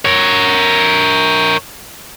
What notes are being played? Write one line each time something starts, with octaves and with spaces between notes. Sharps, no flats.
A#4 C#5